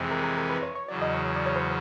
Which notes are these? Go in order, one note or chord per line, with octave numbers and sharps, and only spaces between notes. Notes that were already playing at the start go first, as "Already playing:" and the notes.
Already playing: F2 C3 E3 G#3
A#4
A#4
A#4
B4
C#5
C#5
E2 C#3 F#3 D5
D#5
C#5
D5
C#5
C5